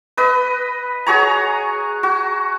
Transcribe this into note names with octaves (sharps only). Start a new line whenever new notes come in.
B4 D#5
F#4 G#4 C#5 A#5
F#4